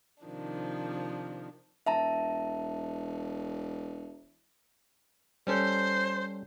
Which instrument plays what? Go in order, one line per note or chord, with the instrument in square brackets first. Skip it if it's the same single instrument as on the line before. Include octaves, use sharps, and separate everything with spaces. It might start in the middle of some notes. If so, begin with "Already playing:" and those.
[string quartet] C3 D#3 F3 D4
[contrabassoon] E1 [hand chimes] E5 A5 A#5
[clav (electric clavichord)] G3 C#4 A4 [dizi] C5